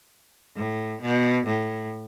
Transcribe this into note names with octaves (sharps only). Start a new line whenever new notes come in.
A2
B2
A2